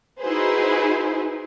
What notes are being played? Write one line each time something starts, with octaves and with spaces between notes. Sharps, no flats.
D#4 E4 F#4 G#4 B4 C5